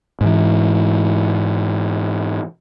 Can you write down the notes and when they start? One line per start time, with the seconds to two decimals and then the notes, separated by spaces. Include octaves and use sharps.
0.21 G#2 E3